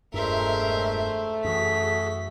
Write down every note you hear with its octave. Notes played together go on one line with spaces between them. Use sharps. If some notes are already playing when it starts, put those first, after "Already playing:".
E1 G2 A#2 G#3 A3 A#4 C5 E5
F#2 E3 F#4 G#4 B6